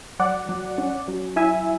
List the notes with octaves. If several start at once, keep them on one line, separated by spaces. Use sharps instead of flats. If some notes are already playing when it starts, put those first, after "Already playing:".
F#3 D5 F#5
F#3
C#4
F#3
E4 E5 G#5